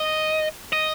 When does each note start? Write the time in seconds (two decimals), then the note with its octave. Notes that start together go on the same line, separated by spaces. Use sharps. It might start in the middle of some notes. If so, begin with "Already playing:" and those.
Already playing: D#5
0.73 D#5